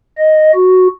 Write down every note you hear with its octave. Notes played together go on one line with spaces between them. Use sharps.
D#5
F#4